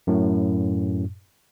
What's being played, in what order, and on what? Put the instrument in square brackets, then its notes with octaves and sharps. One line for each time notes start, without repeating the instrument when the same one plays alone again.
[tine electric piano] F#2 A2